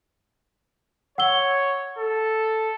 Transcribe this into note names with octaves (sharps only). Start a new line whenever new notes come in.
C#5 F#5 E6 G7
A4